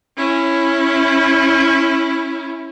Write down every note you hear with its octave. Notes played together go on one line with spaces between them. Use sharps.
C#4 E4